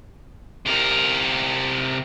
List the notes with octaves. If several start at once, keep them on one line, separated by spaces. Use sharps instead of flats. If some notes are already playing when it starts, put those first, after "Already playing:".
C3 A#4